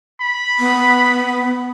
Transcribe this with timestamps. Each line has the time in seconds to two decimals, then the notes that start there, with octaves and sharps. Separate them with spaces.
0.20 B5
0.59 B3